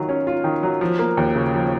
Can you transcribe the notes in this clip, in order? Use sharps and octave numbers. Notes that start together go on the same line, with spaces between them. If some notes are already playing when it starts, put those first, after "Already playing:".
Already playing: D#3 F#3 F4
C#4
F4
D#3
F#3
F3
A#3
D#2
C#3
F3